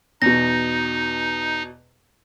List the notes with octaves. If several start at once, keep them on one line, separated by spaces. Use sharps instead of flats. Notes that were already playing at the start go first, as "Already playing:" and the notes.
E2 B2 D#4 A#6